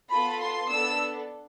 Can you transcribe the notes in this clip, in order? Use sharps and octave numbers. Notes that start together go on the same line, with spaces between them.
B3 F4 A4 B5
C6
B3 D4 A4 E6